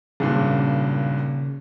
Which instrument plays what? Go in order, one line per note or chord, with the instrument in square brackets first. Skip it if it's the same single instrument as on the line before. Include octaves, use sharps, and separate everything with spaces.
[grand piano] G#1 G2 A#2 [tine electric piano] C#3